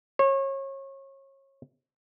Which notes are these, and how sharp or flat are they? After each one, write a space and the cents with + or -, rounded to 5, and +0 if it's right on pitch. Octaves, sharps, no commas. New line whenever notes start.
C#5 -30